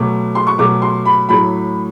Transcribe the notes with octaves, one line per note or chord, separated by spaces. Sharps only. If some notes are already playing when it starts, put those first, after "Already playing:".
Already playing: B2 F#3 A3 D6
C6
C#6
B2 F#3 A3 D6
C6
B5
A2 F#3 A3 B5